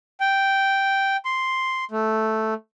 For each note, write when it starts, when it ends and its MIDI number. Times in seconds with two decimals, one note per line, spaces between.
0.20 1.17 79
1.25 1.85 84
1.91 2.54 57